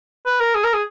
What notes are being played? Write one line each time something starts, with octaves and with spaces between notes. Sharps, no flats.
B4
A#4
G#4
A#4
G#4